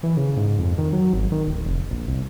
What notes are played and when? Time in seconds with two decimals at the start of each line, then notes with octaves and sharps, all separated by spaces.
0.03 E3
0.17 C#3
0.37 G#2
0.59 F2
0.78 D#3
0.93 F#3
1.14 G#1
1.32 D#3
1.48 D1
1.66 F1
1.90 A#1
2.07 C2